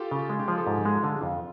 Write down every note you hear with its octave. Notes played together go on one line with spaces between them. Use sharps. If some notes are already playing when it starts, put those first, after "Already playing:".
Already playing: F4 G4 A4
C#3
G#3
G4
F3 G#4
A4
G#2
G#3 F4
D3 F4
F2